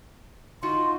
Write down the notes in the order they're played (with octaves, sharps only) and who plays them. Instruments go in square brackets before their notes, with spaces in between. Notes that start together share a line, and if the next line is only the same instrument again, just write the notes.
[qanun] D#4 F4 F#4 [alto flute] C6